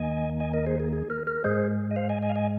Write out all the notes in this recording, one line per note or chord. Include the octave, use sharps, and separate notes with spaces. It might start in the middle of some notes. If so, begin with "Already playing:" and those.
Already playing: D#2 D#3 A#3 D#5 G#5
D#5 G#5
A#4 D#5
G#4 C5
G#4
G#4
A#4
A#4
G#2 G#3 G#4 C5
D#5
C5 F5
D#5 G#5
D#5 G#5
F5
D#5 G#5